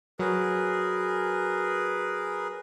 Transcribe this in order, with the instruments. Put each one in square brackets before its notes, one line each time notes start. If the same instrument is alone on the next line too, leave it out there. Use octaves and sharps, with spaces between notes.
[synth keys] F#3 [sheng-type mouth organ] G#4 A#4 B4